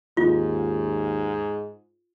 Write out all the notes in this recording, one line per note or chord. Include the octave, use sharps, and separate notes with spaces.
D#2 G#2 F4